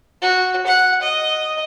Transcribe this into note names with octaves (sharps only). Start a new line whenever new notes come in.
F#4
F#5
D#5